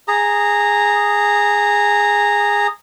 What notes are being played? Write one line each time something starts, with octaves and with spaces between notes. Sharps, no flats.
G#4 A#5